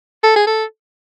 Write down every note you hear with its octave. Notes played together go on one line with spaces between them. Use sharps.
A4
G#4
A4